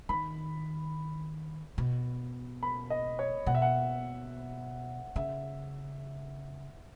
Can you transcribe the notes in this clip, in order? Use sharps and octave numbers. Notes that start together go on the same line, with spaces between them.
D#3 B5
B2
B5
D#5
C#5
B2 F#5
E5
F#5
C#3 E5